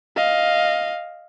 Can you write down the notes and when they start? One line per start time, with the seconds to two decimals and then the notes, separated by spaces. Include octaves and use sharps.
0.16 D#5 F5